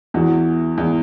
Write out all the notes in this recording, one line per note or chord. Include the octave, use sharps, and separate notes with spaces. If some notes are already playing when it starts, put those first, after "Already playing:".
E2 E3 F#4
E2 E3